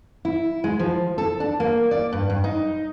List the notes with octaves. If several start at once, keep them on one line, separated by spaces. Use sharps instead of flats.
E4
G#3
F3
A4
D4
A#3
D5
G2
G2
D#4